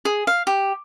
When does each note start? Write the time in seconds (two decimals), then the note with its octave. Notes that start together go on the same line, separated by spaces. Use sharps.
0.05 G#4
0.27 F5
0.47 G4